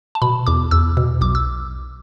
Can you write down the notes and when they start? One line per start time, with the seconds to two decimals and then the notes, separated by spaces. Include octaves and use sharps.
0.15 A5
0.22 B2 B5
0.47 E2 D6
0.71 E2 E6
0.97 B2
1.21 B1 D6
1.35 E6